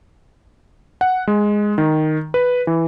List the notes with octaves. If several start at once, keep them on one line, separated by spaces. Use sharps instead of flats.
F#5
G#3
D#3
B4
E3